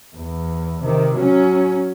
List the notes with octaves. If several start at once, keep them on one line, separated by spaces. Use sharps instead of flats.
E2
C3 D#3
F#3 C#4